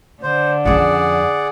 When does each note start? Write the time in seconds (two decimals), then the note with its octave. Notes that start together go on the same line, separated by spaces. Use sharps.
0.23 D3 C5
0.65 F2 C#4 G#4 D5 F#5